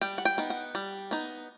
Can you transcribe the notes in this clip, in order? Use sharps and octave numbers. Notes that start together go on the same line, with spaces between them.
G3 G5
F#5
G5
B3 D#4
F#5
G3
B3 D#4